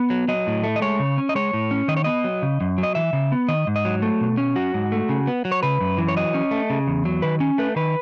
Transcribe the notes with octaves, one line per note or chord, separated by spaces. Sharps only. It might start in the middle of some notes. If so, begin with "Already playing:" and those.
Already playing: B3
F#3
F#3 D#5
A2
A3
D#5
G#3 C#5
C#3
C#4
D#5
G#3 C#5
A2
C#4
D#3 D#5
C#5
B3 D#5
F#3
C#3
F#2
F#3
D#5
E3 E5
C#3
B3
D#3 D#5
G#2
D#5
F#3
A3
B2
C#4
F#3 F#4
G#2
A3
C#3
B3
F#3
C#5
C#3 B4
F#2
E3
C#5
F#3 D#5
C#4
A3
C#3
E2
F#3
D#3 B4
C#4
A3 B4
D#3 B4